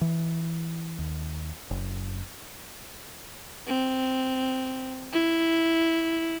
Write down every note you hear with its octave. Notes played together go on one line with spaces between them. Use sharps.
E3
D#2
F#1
C4
E4